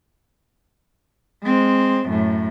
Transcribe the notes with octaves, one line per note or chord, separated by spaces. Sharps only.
G#3 C4
F#2 A2